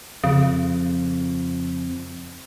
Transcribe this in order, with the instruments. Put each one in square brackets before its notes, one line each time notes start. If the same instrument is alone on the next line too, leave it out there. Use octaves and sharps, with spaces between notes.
[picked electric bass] F2 [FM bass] C#3